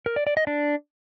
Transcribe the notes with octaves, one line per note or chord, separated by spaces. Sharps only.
A#4
D5
D5
D#5
D4